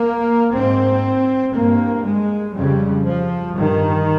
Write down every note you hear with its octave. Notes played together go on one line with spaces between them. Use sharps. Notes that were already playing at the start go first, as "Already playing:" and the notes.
Already playing: A#3
G#2 C4
G2 A#3
G#3
F2 C#3 G3
F3
G2 D#3